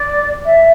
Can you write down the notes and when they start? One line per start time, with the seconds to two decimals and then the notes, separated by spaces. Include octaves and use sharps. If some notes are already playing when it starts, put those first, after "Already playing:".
Already playing: D5
0.45 E5